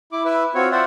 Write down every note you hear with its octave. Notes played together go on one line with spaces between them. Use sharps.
E4 D6
E4 B4 E5
C4 F4 F#4 C#5
F4 C5 D5 E5 F#5